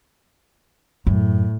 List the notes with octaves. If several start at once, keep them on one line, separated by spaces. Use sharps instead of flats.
F#2 A2